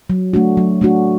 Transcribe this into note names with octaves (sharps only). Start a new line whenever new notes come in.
F#3
A3 D4 F#4
F#3
A3 D4 F#4